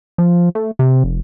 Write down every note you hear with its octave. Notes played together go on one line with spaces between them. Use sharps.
F3
A3
C3
F1